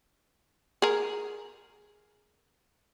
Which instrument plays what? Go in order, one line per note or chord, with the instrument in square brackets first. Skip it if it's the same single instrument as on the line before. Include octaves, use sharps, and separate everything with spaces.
[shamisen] G#4 A#4